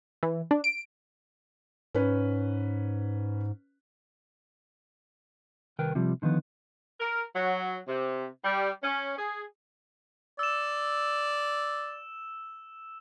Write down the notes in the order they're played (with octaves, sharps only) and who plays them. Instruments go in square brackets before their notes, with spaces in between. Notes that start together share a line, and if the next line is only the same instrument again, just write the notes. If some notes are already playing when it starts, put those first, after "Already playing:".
[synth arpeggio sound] E3
D4
D7
[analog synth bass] G#2 [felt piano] C#4 B4
[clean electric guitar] C2 D#3 A#4 B4 G5
C3 F3 G3
D3 D#3 F3 B3
[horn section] A#4
F#3
C3
G3
C#4
G#4
[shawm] D5 [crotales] E6 E7